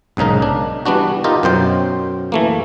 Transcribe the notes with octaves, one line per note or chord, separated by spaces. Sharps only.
B1 G#2 C#3 D#4 A#4
D4
E3 G3 B3 D4 F#4
D#4 F4 G4 A#4
F#2 B2 C5 G5
E3 A3 A#3